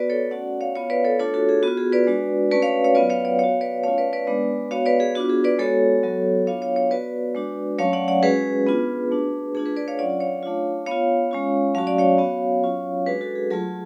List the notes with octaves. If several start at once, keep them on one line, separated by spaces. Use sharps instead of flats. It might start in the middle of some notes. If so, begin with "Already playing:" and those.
Already playing: B3 F#4 B4 D5
A4 C#5
A3 C#4 F#4 D5 F#5
C#5 F5
B3 F4 C#5 F5
B4 D5
A4 C#5
A3 D4 F4 A4 C#5
F#4 A4
G#4
B3 F4 F#4
G#4
B4 D5
G#3 D4 F#4
A3 C#4 F#4 B4 D5
C#5 F5
C#5 F5
F#3 B3 F4 B4 D5
C#5 F5
D5 F#5
B3 F#4 C#5 F5
B4 D5
A3 C#4 F4 C#5 F5
B4 D5
B4 D5
G#3 B3 D4
B3 F#4 C#5 F5
B4 D5
G#4
B3 D4 F4 F#4
G#4
B4 D5
G#3 B3 F#4 A4 C#5
F#3 B3 F#4
B3 D4 F4 C#5 F5
C#5 F5
C#5 F5
B3 F#4 B4 D5
G#3 D4 F#4
F#3 A3 C#4 C#5 F5
D5 F#5
D5 F#5
G#3 C#4 F#4 G#4 B4
B3 D4 F4
A3 D4 F#4
A3 D4 F4 G#4
G#4 B4
B4 D5
C#5 F5
F#3 C#4 F4 D5 F#5
C#5 F5
A3 D4 F4
B3 F4 C#5 F5
G#3 C#4 F4
F#3 A3 C#4 F#4 F5
D5
C#5 F5
B3 F#4
F#3 C#4 F4
G#3 D4 F#4 G#4 B4
F#4 A4
G#4
F#3 A3 F4 G#4